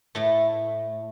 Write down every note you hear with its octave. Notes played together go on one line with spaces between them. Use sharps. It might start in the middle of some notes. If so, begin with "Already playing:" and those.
A2 A3